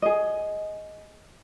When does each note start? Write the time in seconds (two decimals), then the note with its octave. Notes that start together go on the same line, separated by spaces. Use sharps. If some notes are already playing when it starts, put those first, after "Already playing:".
0.02 G#4 D#5